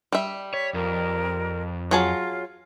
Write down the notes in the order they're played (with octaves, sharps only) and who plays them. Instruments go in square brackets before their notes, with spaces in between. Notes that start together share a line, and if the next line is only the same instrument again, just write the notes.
[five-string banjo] G3 E5
[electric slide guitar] C#5 [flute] B6
[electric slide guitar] F2 [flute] A#4
[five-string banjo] F#3 G#4 A5 [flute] F4